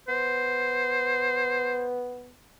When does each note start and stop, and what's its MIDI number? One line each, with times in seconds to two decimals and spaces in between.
0.08 2.31 59
0.08 1.88 72